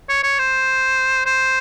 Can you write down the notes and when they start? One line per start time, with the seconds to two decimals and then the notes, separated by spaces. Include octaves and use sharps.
0.09 C#5
0.23 C#5
0.39 C5
1.26 C5